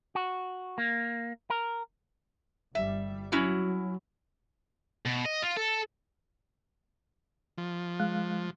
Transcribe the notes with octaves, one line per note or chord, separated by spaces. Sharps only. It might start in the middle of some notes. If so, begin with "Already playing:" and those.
F#4
A#3
A#4
G1 G3 E5
F#3 C#4 E4 F#4
B2
D#5
F4
A4
F3
G#3 F5 F#6